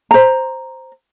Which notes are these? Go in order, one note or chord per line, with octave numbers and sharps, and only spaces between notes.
C5 A#5